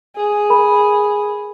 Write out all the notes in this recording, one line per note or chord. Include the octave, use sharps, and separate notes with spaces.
G#4
A#4 B5